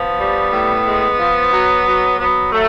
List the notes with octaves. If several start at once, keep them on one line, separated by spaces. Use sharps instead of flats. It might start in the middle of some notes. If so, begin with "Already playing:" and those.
Already playing: F3 B3
G3
A2
G#3
F3
F#3
F#3
F#3 B3
F#3 A3